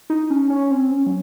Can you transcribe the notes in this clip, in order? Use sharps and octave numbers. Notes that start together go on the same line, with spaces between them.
D#4
C#4
C#4
C4
C#4
F#3